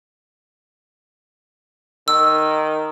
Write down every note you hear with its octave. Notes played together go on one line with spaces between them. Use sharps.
D#3 E6